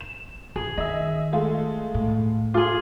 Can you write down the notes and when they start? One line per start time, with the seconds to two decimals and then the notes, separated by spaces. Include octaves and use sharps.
0.01 E7
0.56 F#2 G#4
0.78 D#3 D#5 E5
1.33 G#3 A3 F4
1.94 A2
2.54 F4 G#4 A4 D6